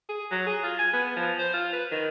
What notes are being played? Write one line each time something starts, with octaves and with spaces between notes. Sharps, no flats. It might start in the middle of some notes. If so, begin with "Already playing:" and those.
G#4
F#3
G#4
F4
G#5
B3
F3
C5
F4
B4
D#3